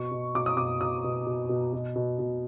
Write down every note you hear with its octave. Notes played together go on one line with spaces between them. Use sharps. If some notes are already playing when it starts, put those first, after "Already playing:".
Already playing: B2 C#6
B2
B2 D6
D#6
B2 D6
B2 D#6
B2
B2
B2
B2
B2
B2